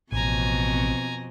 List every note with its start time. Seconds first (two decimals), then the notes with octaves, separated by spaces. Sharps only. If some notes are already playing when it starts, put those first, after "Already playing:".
0.12 A1 F2 B2 C4 G#5 A#5